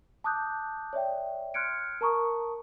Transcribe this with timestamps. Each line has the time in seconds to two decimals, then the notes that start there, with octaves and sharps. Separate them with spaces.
0.24 A5 D6 D#6 F#6 G6
0.93 C#5 D5 E5 G5
1.54 C6 F6 F#6 G#6 C#7 D7
2.01 A#4 A5 A#5 C#6 D#6